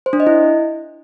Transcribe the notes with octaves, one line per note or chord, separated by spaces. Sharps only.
C5
D4
D#5
E4